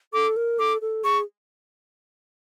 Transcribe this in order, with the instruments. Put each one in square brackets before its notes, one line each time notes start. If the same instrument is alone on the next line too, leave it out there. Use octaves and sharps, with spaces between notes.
[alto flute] A4 [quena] D6
[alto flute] A#4
[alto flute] A4 [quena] D6
[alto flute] A4
[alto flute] G#4 [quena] C#6